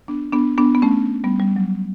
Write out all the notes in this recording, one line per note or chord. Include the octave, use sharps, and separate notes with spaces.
B3 D4
B3 D4
B3 D4
B3
A3 C#4
G3 B3
G3
F#3